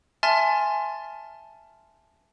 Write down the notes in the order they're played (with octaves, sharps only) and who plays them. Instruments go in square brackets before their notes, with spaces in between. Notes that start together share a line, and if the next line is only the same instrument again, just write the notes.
[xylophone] E5 G#5 A5 C6 F6 A6